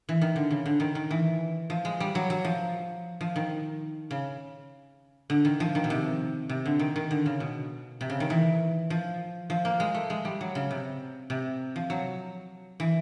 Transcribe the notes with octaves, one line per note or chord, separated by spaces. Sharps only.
E3
D#3
D3
C#3
D3
D#3
D#3
E3
F3
G#3
G3
F#3
F#3
F3
F3
D#3
C#3
D3
D#3
F3
D#3
B2
C3
C3
D3
D#3
D#3
D3
C#3
B2
C3
C#3
D#3
E3
F3
F3
A#3
G#3
A3
G#3
G3
F#3
C#3
C3
C3
F3
F#3
E3